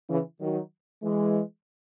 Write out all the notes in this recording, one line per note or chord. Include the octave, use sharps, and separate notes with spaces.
C#3 E3
D#3 F#3
E3 G#3